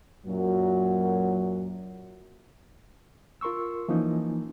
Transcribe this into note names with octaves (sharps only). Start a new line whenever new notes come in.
F#2 A#2 F#3
F4 A#4 C6 C#6 E6
E3 F3 A#3 C#4 D#4